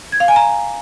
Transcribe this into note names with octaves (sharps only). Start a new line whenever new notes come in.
G#6
F5
G#5
A#5